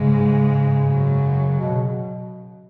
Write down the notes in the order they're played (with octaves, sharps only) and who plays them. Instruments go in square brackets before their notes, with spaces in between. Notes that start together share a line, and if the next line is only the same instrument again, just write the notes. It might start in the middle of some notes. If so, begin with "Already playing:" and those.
Already playing: [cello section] G#2 G#3 [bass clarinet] C#3
[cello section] F#2 F#3
[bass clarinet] B2